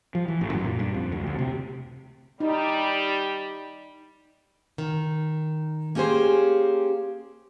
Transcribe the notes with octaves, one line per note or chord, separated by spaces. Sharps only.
F3
E3
A1
F#2
A#2
G2
F2
D2
D2
C3
G3 D#4
D#3
A#3 C#4 G4 G#4 C5